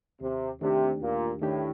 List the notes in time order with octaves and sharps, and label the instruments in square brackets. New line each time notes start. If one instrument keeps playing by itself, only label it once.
[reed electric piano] D#2 [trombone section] C3
[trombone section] C3 [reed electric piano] D#3 A3 D4 G4
[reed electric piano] D#2 [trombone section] A#2
[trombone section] A2 [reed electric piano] D#3 A3 D4 G4